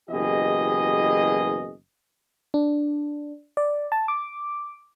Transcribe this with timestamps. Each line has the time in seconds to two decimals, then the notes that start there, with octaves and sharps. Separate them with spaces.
0.10 F#1 B2 E3 G4 G#4 D#5
2.54 D4
3.57 D5
3.92 A5
4.08 D6